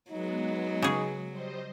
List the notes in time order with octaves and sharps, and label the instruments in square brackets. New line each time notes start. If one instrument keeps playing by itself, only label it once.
[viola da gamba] F#3 [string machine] G#3 B3 [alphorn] D#4
[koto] C#3 G#4
[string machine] G3 C5 D#5